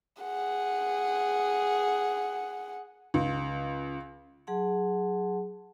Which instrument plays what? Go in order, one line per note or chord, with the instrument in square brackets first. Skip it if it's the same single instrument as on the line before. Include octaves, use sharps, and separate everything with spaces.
[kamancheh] G#4 F#5
[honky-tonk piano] C#2
[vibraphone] F#3 G#4 F#5 A5 C6